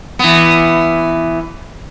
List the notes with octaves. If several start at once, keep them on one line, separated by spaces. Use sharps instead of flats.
E3 B3